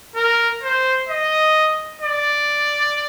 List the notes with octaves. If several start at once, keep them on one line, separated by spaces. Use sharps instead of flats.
A#4
C5
D#5
D5